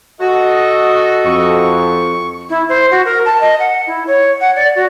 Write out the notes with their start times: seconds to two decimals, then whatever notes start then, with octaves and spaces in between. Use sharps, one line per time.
0.21 F#4 A4 D#5
1.25 F2 C#6
2.50 E4
2.69 C5
2.91 F#4
3.05 A#4
3.25 A5
3.41 D#5
3.60 F#5
3.87 E4
4.07 C#5
4.41 F#5
4.56 D5
4.75 F#4